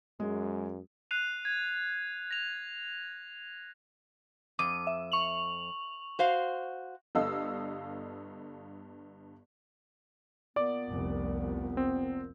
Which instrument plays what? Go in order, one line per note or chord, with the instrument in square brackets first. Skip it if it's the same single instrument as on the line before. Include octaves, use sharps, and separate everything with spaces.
[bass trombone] F#2 [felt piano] G#3
[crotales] F#6 C7 D#7 F7
G#6
A#6 F7
[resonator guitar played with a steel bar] F2 [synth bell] D6 D#7
[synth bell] E5
C#6 F7 F#7
[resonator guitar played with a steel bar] F#4 C5 F5
[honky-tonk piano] G1 G2 A4 D#5 F5 E6
[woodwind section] A#2 B3 [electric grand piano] D5 D6
[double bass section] F1 C2
[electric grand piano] C4